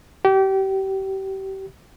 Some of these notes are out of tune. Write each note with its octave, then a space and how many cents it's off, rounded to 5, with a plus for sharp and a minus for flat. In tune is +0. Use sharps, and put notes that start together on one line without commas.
G4 -30